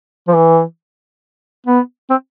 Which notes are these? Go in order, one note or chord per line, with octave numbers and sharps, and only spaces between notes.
F3
E3
B3
C4